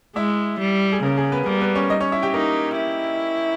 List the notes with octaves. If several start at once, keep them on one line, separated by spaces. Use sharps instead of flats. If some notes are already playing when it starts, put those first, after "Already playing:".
G#3 E4 E5
G3
G#4
C#3 A#3 A#4
G#4
B3 B4
G3 A#3 A#4
B3 B4
C#4 C#5
D#4 D#5
C#4 C#5
E4 E5
G4 G5
A#3 D#4 A#4
E4